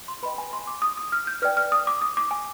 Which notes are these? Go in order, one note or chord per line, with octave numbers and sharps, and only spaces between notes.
C6
B4 D#5 G5 B5
G#5
C6
D6
D#6
D#6
F6
G6
B4 D5 G5 F6
F6
D#6
D6
D#6
D6
G#5